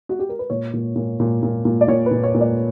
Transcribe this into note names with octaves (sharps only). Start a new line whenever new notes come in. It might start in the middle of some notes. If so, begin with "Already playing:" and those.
F#4
G4
A#4
B4
A#2 C#5
A#2
A#2
A#2
A#2
A#2
D5
A#2 C#5
B4
A#2
C#5
A#2
D5